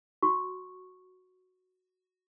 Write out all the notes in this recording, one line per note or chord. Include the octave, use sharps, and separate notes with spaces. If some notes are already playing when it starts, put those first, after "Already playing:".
F#4 C#6